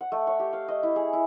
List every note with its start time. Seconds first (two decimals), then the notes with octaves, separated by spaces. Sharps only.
0.01 F#5
0.12 A3
0.27 C#5
0.39 G4
0.53 F5
0.68 D#5
0.83 E4
0.96 G#4
1.13 E4